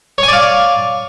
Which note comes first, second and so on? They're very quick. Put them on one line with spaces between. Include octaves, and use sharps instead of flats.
C#5 G#5 D5 F5